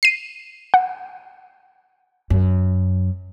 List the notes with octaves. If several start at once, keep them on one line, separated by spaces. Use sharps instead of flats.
C7 D#7
F#5
F#2